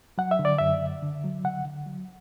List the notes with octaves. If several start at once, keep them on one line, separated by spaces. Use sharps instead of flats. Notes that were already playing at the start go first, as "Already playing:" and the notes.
F#3 F#5
E5
D3
D5
F#2 E5
D3
D3
F#3
D3 F#5
D3
F#3